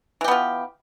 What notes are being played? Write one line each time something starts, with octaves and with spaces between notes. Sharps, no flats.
E3 B3 F4 G4